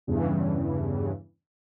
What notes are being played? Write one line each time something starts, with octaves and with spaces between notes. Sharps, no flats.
E2 G2 C#3 E3